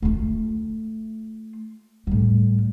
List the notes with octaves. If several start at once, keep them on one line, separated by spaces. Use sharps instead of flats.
A3 F4
A2 G3